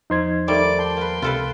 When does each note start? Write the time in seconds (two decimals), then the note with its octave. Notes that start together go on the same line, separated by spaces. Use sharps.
0.10 E2 F3 D#4 C5 C6 G#6
0.48 D#3 G3 A3 D5 D6
0.79 G5 A5 C6
0.97 A#3 B4
1.22 C#2 C3 F4 A4 B4